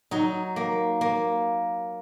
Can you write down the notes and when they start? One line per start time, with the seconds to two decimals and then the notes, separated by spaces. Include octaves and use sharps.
0.11 F#3 D#4
0.56 A#3
1.01 A#3